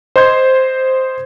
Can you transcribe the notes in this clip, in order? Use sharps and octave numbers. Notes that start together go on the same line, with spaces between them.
C5 D#5 C6 G6 G#6